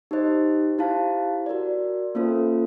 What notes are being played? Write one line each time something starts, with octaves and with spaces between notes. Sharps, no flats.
D#4 G4 C5 D#5
E4 G4 C5 F5 A5
F#4 A#4 D5
A#3 C#4 F4 A4 C5